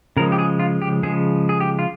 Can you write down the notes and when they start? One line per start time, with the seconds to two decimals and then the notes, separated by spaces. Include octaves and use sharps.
0.17 C#3 F3 G#3 A#4
0.32 G4
0.39 G#4
0.59 F4
0.82 G4
1.03 C#3 F3 G#3 G#4
1.49 G#4
1.60 G4
1.79 F4